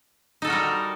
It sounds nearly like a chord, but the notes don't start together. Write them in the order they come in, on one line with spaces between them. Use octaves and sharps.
D#4 A4 F#4 A#4 G3